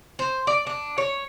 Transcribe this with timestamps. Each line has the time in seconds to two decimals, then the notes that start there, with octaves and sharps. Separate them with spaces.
0.19 C5
0.47 D5
0.67 D4
0.98 C#5